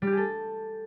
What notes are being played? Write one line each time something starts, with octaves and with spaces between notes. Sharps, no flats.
G3
G4
G#4
A4